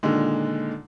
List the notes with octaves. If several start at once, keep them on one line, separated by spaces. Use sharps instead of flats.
A#2 D3 D#3 G#3